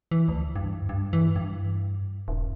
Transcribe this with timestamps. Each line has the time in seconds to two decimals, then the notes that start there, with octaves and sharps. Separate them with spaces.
0.11 E3
0.28 D2
0.56 G2
0.89 G2
1.13 E3
1.36 G2
2.28 D#1